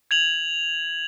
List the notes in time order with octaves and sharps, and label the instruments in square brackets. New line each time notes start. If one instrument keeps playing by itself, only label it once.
[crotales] G#6 F7 F#7